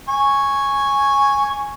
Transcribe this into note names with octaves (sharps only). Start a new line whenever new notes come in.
G#5 C#6